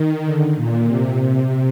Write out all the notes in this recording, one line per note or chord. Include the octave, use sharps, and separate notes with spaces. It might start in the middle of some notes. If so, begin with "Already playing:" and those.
Already playing: D#3
D3
A#2
C3